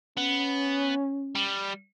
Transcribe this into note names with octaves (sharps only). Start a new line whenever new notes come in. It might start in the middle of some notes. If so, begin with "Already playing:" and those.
B3 C#4
G3